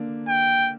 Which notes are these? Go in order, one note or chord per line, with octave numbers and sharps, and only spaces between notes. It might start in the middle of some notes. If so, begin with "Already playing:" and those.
Already playing: D3 A#3 D4
G5